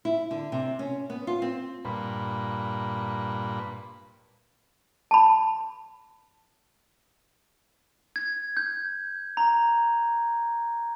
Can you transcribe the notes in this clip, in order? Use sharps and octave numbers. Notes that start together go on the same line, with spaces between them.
E4
D3
C3
C#4
B3
F4
C4
G2 A#2 B4
A5 B5
G#6
G6
A#5